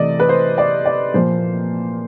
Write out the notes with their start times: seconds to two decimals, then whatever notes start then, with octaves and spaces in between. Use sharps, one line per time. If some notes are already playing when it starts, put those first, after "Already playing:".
Already playing: C3 E3 A3 D5 D#5
0.20 B4
0.29 C5
0.58 D5
0.85 D5
1.14 A#2 F3 A#3 C5